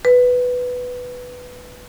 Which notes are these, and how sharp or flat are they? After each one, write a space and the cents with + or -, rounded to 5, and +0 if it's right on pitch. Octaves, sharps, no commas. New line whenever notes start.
B4 +5